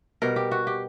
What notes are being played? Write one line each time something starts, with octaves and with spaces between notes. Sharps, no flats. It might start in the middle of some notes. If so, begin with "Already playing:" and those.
B2 G3 A#4
G4
F#4
G4